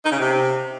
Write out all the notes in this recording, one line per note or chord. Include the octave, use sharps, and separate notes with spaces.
D#4
C#3
C3